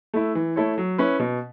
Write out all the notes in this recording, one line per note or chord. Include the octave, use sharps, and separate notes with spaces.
A3 E4
E3
A3 E4 A4 C#5
F#3
C#4 E4 B4
B2